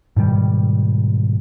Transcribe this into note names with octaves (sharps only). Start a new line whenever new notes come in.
G#2 B2 D#3 G3